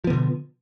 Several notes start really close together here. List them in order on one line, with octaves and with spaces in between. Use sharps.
F3 B3 D3 B2